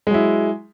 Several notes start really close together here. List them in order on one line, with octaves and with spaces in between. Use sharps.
G#3 F#3 E4